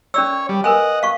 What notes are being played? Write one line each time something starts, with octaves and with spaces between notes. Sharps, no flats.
C#4 C#5 D5 E6
G3
A#4 B4 D#5 F#5 G#5
F5 C#6